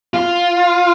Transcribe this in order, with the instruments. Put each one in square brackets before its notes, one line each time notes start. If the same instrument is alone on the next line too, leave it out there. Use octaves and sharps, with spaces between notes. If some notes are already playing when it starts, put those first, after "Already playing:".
[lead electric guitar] F4